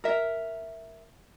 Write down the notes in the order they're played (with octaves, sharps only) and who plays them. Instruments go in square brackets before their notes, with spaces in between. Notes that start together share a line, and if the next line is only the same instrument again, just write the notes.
[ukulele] A#4 E5